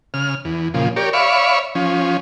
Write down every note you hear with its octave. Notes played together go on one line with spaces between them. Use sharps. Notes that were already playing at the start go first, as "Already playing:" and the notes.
C#3 F6
E2
A#2 C#3 F3
G4 A#4 C#5 D5
C#5 D5 E5 F5 B5 C#6
F3 C#4